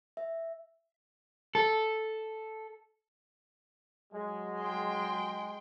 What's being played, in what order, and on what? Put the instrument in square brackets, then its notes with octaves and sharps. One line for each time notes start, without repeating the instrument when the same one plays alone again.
[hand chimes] E5
[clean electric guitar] A4
[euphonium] F#3 [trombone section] G#3
[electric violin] G5 C6